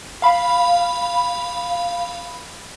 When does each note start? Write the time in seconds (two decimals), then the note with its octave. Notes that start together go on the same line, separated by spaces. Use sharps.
0.22 F5 B5